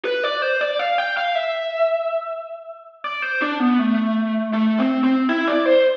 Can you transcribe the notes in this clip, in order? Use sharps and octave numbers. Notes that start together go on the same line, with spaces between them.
B4
D5
C5
D5
F5
G5
F5
E5
D5
C5
D4
B3
A3
A3
C4
C4
E4
D5
C5